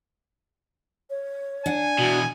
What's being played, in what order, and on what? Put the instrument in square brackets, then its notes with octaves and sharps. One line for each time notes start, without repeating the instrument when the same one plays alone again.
[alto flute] C#5
[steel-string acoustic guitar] D4 F#5 [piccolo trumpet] G#5
[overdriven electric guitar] E2 B2 [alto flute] F#4